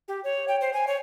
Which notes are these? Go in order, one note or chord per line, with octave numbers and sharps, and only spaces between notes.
G4
C#5
G5
C5
G#5
C#5